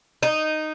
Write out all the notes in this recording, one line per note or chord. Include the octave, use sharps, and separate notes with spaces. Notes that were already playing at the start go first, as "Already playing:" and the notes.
D#4